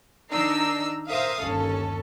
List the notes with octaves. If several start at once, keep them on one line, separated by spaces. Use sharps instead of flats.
D#3 D4 D#4 A#5 E6 C7
A#4 C5 E5 F5 D#6
G1 D#2 C#4 A4